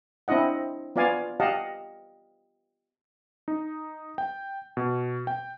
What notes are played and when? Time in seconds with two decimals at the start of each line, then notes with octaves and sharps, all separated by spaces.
0.28 C4 D4 E4 D#5 F#5
0.96 B3 F4 D5 F5 G#5
1.40 G4 D#5 F5 F#5 A5
3.48 D#4
4.18 G5
4.77 B2
5.27 G5